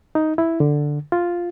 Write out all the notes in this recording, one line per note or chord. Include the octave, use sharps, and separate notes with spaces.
D#4
E4
D3
F4